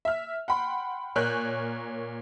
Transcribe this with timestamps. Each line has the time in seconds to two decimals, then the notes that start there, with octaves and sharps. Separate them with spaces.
0.05 E5 F6
0.48 F#5 G5 B5 C6
1.15 A#2 A#4 C#5 G#5 F#6 G6